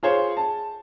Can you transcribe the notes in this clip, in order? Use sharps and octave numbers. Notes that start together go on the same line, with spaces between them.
F4 G#4 C5 C#5
A5